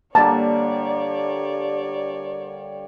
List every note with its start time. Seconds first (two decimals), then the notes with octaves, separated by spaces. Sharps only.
0.15 D3 G3 A#3 C#5 D5 A5